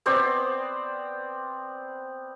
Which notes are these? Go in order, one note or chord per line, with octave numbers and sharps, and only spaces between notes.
B3 C4 C5 D5